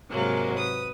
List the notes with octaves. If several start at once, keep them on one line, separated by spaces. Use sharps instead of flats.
G#2 C3 F#3 G#3 A#3
B4 D#6